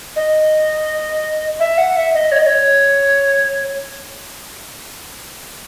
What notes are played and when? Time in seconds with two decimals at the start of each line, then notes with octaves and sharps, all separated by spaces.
0.16 D#5
1.60 E5
1.78 F#5
1.96 E5
2.14 D#5
2.32 C#5
2.39 D#5
2.47 C#5